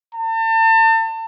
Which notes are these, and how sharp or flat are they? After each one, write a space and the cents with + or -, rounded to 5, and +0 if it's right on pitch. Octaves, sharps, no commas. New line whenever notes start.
A5 +40